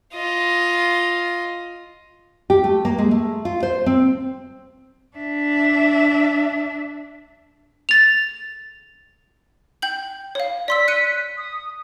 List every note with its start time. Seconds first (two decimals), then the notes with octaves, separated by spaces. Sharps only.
0.14 F4 D#5
2.50 G4
2.64 A3
2.85 A#3
2.98 G#3
3.11 A3
3.45 F4
3.63 C5
3.86 C4
5.17 D4 E5
7.89 A6 F7
9.82 G5 G6 F#7
10.35 C#5 F5
10.68 D5 C6 E6 B6
10.88 F#6 C#7 D#7
11.37 D#6